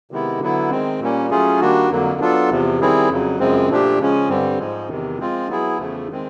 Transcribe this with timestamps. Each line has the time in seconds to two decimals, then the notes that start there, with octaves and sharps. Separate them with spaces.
0.11 C3 D#3 G#3 B3 E4
0.41 D3 F#3 B3 E4
0.71 D#3 G#3 C4
1.00 A#2 G3 A#3 C#4
1.30 F#3 A3 C#4 F4 G#4
1.60 D#3 G3 A#3 D4 F#4
1.90 F2 D3 F#3 A#3
2.20 F#3 B3 D4 F4 A4
2.50 E2 C3 F3
2.80 D#3 G3 C4 E4 G#4
3.09 F2 C#3 F#3
3.39 F#2 C#3 F3 G#3 C4
3.69 A#2 F3 A3 D4 G4
3.99 C#3 F3 G#3 C#4
4.29 G2 D3 G3 C4
4.59 G#2 F3 G#3
4.88 E2 C3 D#3
5.19 F3 G#3 C4 F4
5.48 F#3 B3 E4 G#4
5.78 E2 C#3 F3 A3
6.10 D#3 G#3 C4